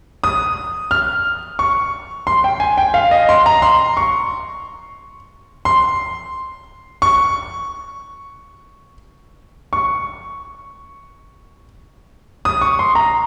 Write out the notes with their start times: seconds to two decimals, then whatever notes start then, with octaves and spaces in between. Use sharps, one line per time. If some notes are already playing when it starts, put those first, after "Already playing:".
0.24 D#6
0.91 F6
1.59 C#6
2.27 C6
2.44 G5
2.60 G#5
2.77 G5
2.94 F5
3.11 D#5
3.29 C6
3.46 A#5
3.62 C6
3.97 C#6
5.65 C6
7.02 C#6
9.73 C#6
12.45 D#6
12.61 C#6
12.79 C6
12.95 A#5